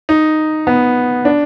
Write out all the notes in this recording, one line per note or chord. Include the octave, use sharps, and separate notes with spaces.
D#4
B3
D4